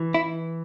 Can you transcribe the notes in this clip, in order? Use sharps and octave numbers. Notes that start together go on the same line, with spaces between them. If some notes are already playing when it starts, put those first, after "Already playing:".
Already playing: E3
E4